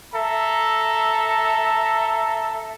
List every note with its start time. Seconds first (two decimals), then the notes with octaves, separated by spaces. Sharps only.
0.13 A4 E5 A#5